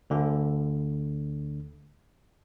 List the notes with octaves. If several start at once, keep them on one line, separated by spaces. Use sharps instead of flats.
D2 D3